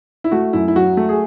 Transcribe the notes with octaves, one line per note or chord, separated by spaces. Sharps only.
E4
A3 F#4
F#2 E4
E4
F#3 F#4
A3
G#4